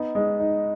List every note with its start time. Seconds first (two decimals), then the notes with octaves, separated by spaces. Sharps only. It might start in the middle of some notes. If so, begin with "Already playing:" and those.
Already playing: B3 D#4
0.15 G#3
0.40 D#4